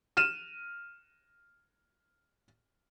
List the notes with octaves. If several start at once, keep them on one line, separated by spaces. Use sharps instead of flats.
F6 D#7 E7